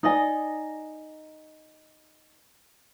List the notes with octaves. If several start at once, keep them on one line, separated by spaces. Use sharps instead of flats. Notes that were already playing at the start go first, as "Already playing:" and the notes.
D#4 D5 D#5 G#5